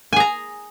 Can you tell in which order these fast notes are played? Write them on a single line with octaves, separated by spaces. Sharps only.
G#5 G#4 A#5